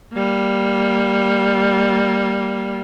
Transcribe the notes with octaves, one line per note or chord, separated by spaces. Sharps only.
G3 A#3